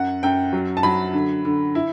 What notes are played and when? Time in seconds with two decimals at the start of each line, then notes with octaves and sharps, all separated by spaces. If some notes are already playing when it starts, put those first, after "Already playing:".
Already playing: F#2 F#5
0.23 F#2 G5
0.53 F#3
0.77 A5
0.83 F#3 B5
1.13 D3
1.45 D3
1.75 E4